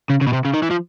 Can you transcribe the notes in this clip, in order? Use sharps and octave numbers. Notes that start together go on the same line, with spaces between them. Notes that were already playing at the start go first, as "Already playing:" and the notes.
C#3
C#3
B2
C3
C#3
D#3
E3
F3